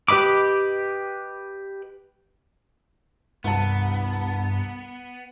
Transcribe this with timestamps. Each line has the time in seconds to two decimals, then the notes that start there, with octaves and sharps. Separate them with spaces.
0.08 G4 B4 D#5 B5 D6
3.44 C2 G2 B3 A5